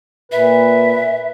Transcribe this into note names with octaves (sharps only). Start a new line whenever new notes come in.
A#2 B4 E5